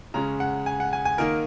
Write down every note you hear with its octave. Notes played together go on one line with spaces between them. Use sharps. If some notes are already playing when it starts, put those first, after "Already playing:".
C#3 G#3 C#4 A#5
F#5
G#5
F#5
G#5
G#5
D#3 A#3 D#4 A#4